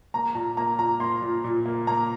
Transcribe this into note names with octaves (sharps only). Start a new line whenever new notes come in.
A#3 A#5
A#2 A#5
A#3 A#5
A#2 A#5
A#3 C6
A#2
A#2
A#3
A#3 A#5